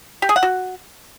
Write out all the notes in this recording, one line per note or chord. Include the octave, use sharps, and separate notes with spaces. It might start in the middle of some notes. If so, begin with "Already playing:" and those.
G4
G#4
F#5
F#4